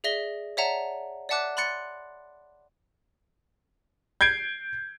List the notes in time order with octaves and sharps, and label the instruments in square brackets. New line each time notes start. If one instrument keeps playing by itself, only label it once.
[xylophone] G#4 D5 E5 A#6 G7
C#5 D5 E5 F#5 A5 A#5
D5 E5 F#5 A5 D6 F#6
B5 C6 F#6 A6 C#7
[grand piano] G6 G#6 C7 D7